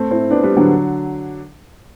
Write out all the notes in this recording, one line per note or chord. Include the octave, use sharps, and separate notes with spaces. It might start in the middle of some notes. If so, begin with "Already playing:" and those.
Already playing: A3 C4
C4 E4
B3 D4
G3 B3
D3 F#3